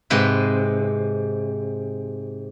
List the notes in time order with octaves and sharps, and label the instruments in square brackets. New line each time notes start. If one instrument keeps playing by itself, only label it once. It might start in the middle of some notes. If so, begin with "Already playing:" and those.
[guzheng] G#2 C3 G#3 B4